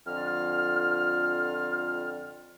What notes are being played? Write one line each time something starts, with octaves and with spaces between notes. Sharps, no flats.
F2 D3 F4 F6